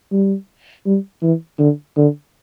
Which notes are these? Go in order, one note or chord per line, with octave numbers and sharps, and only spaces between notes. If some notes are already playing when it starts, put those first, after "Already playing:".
G3
G3
E3
D3
D3